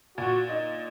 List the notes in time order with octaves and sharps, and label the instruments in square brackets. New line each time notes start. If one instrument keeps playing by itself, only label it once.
[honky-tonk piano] A#2 [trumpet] F#4
[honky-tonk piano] D#4